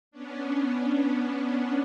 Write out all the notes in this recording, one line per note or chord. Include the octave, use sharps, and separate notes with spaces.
B3 C#4 D4